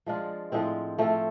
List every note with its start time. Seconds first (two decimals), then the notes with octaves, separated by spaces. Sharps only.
0.06 F3 G#3 D4 F4
0.52 A2 F3 G#3 C4
0.98 F3 A3 C4